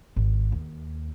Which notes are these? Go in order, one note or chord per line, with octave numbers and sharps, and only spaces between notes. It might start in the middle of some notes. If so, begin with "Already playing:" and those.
G#1
D#2